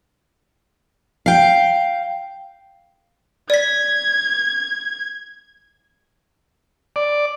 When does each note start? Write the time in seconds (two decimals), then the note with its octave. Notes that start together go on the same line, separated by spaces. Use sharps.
1.26 F5 G5
3.50 D5 G#6 B6
6.96 D5